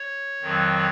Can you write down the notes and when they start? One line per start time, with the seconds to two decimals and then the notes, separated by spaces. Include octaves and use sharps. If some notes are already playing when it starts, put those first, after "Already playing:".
Already playing: C#5
0.42 F2 D#3 F#3